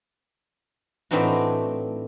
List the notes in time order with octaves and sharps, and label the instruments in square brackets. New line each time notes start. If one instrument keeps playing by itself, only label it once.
[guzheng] A2 E3 C4 D4 D#4 F#4